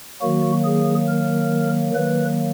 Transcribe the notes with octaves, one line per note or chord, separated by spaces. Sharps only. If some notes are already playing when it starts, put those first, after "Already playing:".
D#3 F#3 A#3 F#4
G#4
A#4
D#3 F#3 A#3 B4